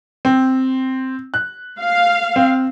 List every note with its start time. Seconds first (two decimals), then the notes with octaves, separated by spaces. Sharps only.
0.25 C4
1.34 F#6
1.79 F5
2.36 C4